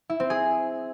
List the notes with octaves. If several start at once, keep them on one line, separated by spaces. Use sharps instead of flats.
E4
C4
G#4